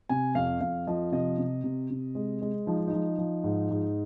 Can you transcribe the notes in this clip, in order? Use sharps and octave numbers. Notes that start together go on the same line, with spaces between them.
C3 G#5
F2 F5
F2 F5
F3 D#5
C3 D#5
C3
C3
C3
G#3
G#3
F3 D#4
F4
D#4
F3
F3
G#2
G#2